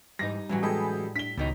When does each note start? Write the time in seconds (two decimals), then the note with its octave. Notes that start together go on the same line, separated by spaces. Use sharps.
0.19 G#2 E3 G3 D#4 A#6
0.49 F#2 A2 E3 F#3 G3
0.63 G#3 G4 A4 G#5 B5 D#6
1.16 D4 B6 G7
1.38 C#2 B2 D#3 D#4